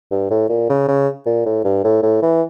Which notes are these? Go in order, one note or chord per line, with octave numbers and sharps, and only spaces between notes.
G2
A2
A#2
C#3
C#3
A#2
A2
G2
A2
A2
E3